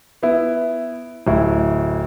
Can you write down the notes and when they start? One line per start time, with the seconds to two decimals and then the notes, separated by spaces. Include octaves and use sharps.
0.23 B3 E4
1.27 D1 E4